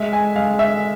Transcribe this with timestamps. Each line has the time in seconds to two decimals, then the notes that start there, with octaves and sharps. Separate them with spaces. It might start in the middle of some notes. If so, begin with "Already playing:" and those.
Already playing: G#3 E5
0.13 G#5
0.36 G#3 F5
0.59 E5